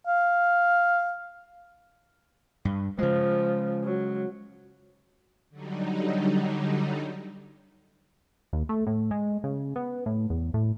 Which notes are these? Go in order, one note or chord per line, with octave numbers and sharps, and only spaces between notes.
F5
G2
C#3 F3 G#3
F#3
D3 F#3 G3 D#4
D#2
A3
A2
G#3
C#3
B3
A2
E2
A2